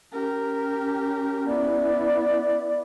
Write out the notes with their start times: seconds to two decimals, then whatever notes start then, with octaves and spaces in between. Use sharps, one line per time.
0.13 C#4 G4 A#4
1.47 B3 E4 D5